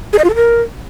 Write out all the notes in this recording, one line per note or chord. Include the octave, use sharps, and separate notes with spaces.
G#4
D#5
F4
A4
A#4